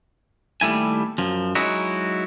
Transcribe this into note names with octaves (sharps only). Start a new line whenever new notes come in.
D#2 G3 A3 E4 G#5
F#2 F3
F#3 G#3 D#4 E4 F#4